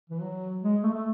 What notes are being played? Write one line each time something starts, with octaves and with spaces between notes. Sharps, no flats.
E3
F#3
G#3
A3
A3